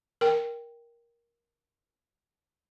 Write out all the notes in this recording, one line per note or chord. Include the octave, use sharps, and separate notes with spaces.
A#4 G5